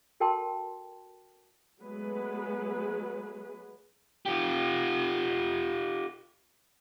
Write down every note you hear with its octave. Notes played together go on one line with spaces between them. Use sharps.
F#4 A4 A#4 G5 A5 C6
F#3 G#3 A3 B3 G#4 B4
F4 G4